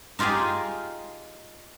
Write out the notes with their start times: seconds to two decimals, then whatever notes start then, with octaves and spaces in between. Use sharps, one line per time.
0.19 D#4 F4 G4 G#4 G#5